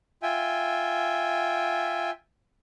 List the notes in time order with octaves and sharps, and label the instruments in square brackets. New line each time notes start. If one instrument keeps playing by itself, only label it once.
[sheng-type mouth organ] F4 E5 G5 G#5